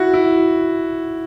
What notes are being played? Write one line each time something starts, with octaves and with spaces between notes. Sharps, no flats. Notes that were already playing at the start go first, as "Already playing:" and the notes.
Already playing: E4 F#4
E4